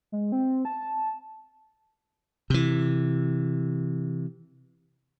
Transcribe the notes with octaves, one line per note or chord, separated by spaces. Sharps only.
G#3
C4
A5
C3 E3